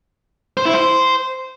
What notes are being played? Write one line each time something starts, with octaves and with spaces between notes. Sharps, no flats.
C5
E4
C5